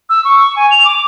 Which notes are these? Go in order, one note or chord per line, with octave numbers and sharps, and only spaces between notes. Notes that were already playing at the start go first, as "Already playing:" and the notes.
E6
C#6
G#5
F7
D6